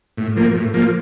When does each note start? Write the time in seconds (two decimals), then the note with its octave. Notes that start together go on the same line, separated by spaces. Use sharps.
0.17 A2
0.36 F3 A#3
0.55 A2
0.74 F3 A#3